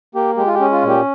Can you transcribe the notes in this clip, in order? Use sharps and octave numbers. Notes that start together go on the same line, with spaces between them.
A#3 G4
G#3 G4
F4
G4
C#4
F4
A#2
G4